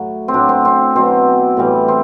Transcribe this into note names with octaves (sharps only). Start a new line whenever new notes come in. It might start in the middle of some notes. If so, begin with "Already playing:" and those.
Already playing: A2 F#3
C4
A2 F#3 D4
C4
C4
B2 F#3 C4
A2 E3 G3
C4